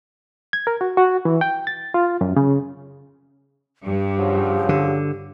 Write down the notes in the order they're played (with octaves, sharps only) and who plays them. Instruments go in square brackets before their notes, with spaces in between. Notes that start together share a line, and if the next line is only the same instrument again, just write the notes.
[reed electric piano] G#6
A#4
F#4
F#4
E3
G5
A6
F4
F#2
C#3
[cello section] G2 [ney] G4
[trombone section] C#3 F3 F#3
[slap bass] D3